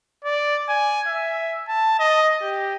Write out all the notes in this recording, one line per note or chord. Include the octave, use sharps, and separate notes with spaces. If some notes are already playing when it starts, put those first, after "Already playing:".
D5
G#5
E5
A5
D#5
G4